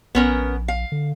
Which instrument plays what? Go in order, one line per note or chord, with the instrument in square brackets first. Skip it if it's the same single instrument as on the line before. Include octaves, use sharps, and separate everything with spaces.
[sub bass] A#1 [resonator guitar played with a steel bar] B3 C#4 A#4
[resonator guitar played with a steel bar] F5
[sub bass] D3